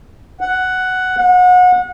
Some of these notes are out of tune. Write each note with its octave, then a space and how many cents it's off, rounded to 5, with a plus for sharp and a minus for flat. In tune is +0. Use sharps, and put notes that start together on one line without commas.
F#5 +5
F#5 -30